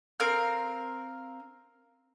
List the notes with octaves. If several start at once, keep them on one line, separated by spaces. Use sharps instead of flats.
C4 A#4 F5 F6